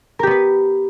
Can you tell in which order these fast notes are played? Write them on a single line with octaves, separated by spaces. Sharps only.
A#4 G4 B3 B4